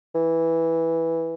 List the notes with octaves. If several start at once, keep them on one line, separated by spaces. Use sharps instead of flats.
E3